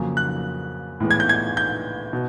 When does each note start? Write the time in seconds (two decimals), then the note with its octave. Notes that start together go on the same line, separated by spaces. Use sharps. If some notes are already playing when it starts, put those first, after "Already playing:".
Already playing: F2 C#3 F#3 A#3
0.17 F#6
1.00 A2 E3 G#3 B3
1.11 G#6
1.20 G6
1.29 G#6
1.57 G6
2.13 B2